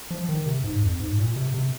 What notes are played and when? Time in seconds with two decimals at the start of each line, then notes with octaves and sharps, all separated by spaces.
0.11 F3
0.29 D#3
0.46 C3
0.64 G#2
0.83 F2
1.00 G#2
1.18 A#2
1.36 C3
1.54 C3